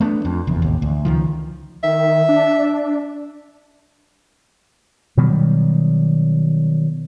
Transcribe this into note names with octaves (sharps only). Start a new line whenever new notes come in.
A3 B3 C4 D4
F2
F1 E2
A1 D#2
D2
C#2 D#3 F3
D#3 E5
D4
B2 D#3 F#3 G3